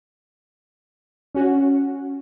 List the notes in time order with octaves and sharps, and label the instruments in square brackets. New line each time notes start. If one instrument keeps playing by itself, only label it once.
[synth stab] C#4 F#4